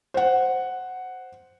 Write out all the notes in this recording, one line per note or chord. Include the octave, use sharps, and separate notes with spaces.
C5 F#5